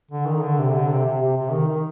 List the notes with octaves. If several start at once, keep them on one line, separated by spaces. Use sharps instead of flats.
D3
D#3
D3
C3
D3
C3
C3
C3
C3
D#3
D#3